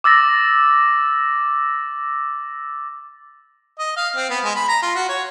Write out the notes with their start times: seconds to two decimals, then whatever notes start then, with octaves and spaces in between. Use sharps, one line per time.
0.04 D6 E6 A6 A#6
3.79 D#5
3.97 F5
4.16 C4
4.30 B3
4.44 G#3
4.55 B5
4.68 A#5
4.82 F4
4.95 F#4
5.09 C#5